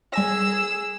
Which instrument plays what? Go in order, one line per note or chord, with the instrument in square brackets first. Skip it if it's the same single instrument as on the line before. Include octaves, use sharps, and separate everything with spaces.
[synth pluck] G3 G#5 A#6 [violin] G#4 E6